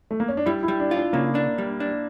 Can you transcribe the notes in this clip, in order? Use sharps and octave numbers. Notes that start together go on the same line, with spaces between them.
A3
A#3
C#4
D4
G3 E4
E4
G3
D4
F4
D4
C#3 A#3
D4
G3
D4